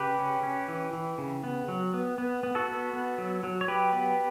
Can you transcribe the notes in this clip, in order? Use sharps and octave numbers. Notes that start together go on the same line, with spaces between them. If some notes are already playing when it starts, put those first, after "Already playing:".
Already playing: C#3 G4 B4
C#4
C#4
E3
E3
C#3
B3
F#3
B3
B3
B3
F#4 A4
B3
B3
F#3
F#3
C#5
F#3 G4 B4
B3